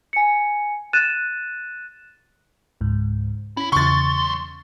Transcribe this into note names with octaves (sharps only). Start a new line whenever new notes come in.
G#5 C#7
F#6 A6 D#7 E7
C#2 G#2
C#4 E4 B6
B1 E2 C#3 C6 C#6 A6